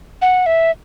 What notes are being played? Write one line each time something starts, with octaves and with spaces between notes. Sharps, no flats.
F#5
E5